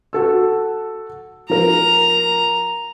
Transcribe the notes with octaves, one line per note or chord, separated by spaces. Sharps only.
F#4 A4 E6
F3 A#4 A#5